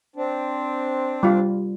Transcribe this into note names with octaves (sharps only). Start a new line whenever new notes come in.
C4 D4
G3 F4